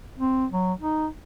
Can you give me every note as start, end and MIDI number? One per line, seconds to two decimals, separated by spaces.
0.19 0.46 60
0.51 0.73 54
0.80 1.07 63